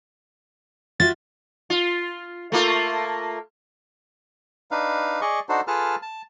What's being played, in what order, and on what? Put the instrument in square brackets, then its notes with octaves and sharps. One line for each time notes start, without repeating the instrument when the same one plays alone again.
[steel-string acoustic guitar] F4 F#4 E5 [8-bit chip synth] A6
[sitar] F4
A3 A#3 F4
[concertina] D4 D#4 B4 F5
G#4 D5 D#5 C#6
D4 D#4 F#4 A4 C5
F4 G#4 A4 B4 A5 F6
A5